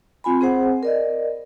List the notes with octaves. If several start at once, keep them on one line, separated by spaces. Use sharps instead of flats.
C4 F4 G#5 B5
C4 G#4 C5 F#5
A#4 D5 D#5